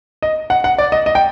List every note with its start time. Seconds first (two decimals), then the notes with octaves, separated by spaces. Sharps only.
0.22 D#5
0.50 F#5
0.64 F#5
0.78 D5
0.92 D#5
1.06 D#5
1.15 G5